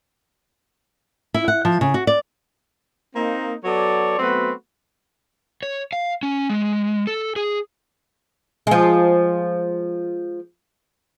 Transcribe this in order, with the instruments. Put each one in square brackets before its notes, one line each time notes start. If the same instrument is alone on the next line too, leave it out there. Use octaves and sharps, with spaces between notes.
[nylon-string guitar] E4
F#5
F3
C#3
F#4
D5
[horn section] A#3 C4 D#4
F#3 B3 A4 C#5 D5
F#3 A3 B3 C4 F#4 B4
[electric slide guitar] C#5
F5
C#4
G#3
A4
G#4
[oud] F3 G#3